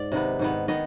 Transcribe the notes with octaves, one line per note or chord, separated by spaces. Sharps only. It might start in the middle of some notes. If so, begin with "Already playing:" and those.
Already playing: G#2 D5
C3 D#3 B3
G#2 D#3 B3
D#3 B3 D#5